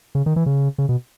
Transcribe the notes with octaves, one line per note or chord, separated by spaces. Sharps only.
C#3
D#3
E3
C#3
C#3
B2